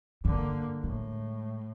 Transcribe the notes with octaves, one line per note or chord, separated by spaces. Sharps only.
G2 D3 A#3
A2 G#3